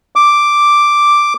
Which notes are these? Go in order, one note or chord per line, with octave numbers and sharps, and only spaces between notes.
D6